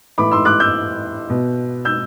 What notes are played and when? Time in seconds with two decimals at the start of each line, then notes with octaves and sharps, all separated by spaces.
0.18 A2 E3 B5 D6
0.31 C6 E6
0.45 D6 F#6
0.60 E6 G6
1.30 B2
1.85 E6 G6